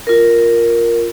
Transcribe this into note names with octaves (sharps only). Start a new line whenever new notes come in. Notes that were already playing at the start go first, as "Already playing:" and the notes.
F4 A#4